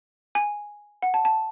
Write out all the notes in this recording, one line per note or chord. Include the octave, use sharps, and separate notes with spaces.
G#5
F#5
A5
A5